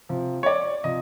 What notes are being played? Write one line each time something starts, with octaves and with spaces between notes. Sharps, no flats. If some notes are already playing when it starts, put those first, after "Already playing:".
C3 F3
C#5
D5
C3 F3 D#5